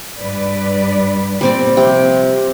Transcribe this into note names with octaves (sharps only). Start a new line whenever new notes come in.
G2 B4 D5
A#2 G3 C4 D5
C3 F3 G5